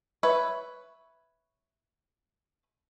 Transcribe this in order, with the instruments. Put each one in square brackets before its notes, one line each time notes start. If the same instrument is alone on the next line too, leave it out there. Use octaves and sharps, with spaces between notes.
[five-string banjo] B4 C#5 E5